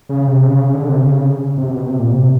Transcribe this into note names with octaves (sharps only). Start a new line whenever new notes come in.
C#3
C3
C#3
D3
C3
C#3
C3
B2
C3
A#2
C3